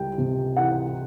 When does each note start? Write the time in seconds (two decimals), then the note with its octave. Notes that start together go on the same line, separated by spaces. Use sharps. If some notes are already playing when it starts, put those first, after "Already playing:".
Already playing: C#2 G3 G5
0.18 C3
0.57 E3 F#5